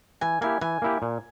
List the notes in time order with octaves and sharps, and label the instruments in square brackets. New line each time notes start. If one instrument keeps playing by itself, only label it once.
[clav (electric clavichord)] E3 [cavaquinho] G#5
[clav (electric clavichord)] A#3 E4 G4 [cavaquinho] G#5
[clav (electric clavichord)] E3 [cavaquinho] G#5
[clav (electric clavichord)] A#3 E4 G4
A#2